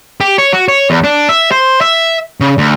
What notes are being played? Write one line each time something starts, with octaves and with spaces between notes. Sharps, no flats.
G4
C#5
F#4
C#5
E2
D4
E5
C5
E5
C#3
D2